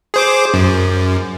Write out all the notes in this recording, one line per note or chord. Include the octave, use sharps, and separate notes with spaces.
G#4 C5 D6
F#2